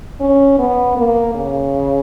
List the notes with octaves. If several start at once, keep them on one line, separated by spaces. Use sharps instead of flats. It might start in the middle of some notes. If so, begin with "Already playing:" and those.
C#4
B3
A#3
C#3